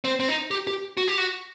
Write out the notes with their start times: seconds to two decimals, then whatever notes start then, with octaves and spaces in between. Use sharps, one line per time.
0.04 C4
0.20 C4
0.29 D#4
0.51 G4
0.67 G4
0.97 F#4
1.08 G4
1.18 F#4